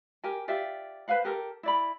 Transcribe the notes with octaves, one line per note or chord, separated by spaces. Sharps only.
G4 A#4 G#5
F4 G4 D5 E5
B4 C5 F5 F#5
G4 A4 A#4
E4 D5 B5